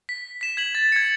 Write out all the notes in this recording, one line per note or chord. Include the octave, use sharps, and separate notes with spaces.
B6
B6 E7
G#6 B6 F#7
A6
G#6 C#7